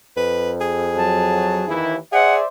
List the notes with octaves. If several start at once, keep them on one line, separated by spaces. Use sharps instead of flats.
F2 B4
G#4
F#3 A5
D#2 E3 E4
G#4 C5 D5 E5 F#5